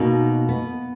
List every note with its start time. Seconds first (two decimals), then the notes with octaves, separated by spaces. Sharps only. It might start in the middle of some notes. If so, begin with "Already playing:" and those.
Already playing: B2 A#3 D#4
0.49 B3